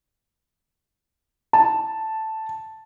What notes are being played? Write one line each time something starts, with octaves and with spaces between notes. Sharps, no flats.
A5